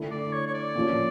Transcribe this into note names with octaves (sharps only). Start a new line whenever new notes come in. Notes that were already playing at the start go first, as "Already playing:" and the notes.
Already playing: D3 A3 E4
D5
C#5
C#5
D5
A#2 F3 C#4 F4